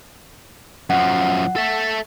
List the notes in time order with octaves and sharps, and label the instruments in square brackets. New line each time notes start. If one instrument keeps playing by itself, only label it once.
[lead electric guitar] F#2 F3 [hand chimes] F#5
[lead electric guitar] A4 E5